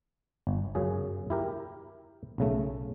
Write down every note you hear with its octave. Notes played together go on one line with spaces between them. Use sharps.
G1
F#2 C#3 G#4
E4 G4 A#4
B1 C#3 A3